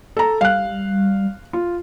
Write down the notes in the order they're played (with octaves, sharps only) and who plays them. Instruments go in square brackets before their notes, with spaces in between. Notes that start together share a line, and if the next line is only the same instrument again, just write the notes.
[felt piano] A4 A#5
[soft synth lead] G3 [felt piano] F5 F#6
[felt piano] F4